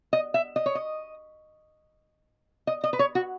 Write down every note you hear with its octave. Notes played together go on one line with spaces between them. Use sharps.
D#5
E5
D#5
C#5
D#5
D#5
D#5
B4
C#5
F#4